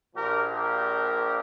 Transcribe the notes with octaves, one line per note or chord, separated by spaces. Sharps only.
A#1 A#2 F3 G4 A#4
G4 A#4